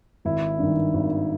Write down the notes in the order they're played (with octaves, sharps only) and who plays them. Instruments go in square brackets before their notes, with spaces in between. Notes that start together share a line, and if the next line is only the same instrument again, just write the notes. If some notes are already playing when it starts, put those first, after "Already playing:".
[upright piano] G#1 E4
G2 D#3
G#1